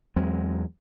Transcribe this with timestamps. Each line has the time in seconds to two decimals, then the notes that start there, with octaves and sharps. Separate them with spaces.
0.16 E2 F#3 G#3 C4